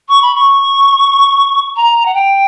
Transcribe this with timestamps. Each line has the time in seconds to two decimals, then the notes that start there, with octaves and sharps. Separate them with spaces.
0.09 C#6
0.22 B5
0.35 C#6
1.76 A#5
2.05 F#5
2.14 G5